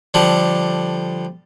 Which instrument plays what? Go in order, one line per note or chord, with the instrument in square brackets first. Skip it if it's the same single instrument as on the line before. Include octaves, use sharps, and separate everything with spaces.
[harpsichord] D3 F3 G3 A4